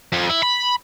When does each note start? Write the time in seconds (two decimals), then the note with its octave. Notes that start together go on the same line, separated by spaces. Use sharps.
0.13 F2
0.30 E4
0.43 B5